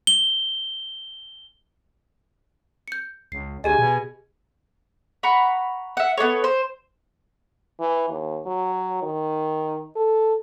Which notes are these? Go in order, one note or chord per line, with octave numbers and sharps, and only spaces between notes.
G7
G6 C#7
C#2 C7
D2 G4 G#4 D#5 G#5
B2
F#5 A#5 B5 C#6
E5 F#5
B3 D4 A4 C#5
C5
E3
D#2
F#3
D#3
A4